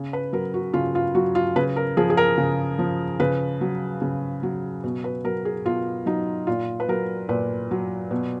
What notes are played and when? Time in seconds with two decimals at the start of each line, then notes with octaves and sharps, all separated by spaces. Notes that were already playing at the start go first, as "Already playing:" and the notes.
Already playing: C#3
0.13 B4
0.33 F#3 A#4
0.54 F#4
0.74 C#3 F4
0.95 F4
1.15 F#3 F#4
1.35 F4
1.56 C#3 B4
1.76 A#4
1.97 F3 G#4
2.10 G#4
2.17 A#4
2.38 C#3
2.79 F3
3.20 C#3 B4
3.61 F#3
4.02 C#3
4.43 F#3
4.84 B2
5.04 B4
5.24 F#3 A#4
5.45 G#4
5.65 B2 F4
6.06 F#3 D#4
6.47 A#2 F4
6.80 B4
6.89 F#3 A#4
7.29 A#2 B4
7.71 F#3
8.11 B2